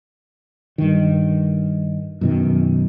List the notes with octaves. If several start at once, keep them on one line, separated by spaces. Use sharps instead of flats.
G2 D#3
F#2 B2 D#3